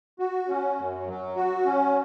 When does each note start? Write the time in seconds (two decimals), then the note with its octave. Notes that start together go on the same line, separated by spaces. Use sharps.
0.19 F#4
0.48 C#4
0.77 F#2
1.07 F#3
1.36 F#4
1.65 C#4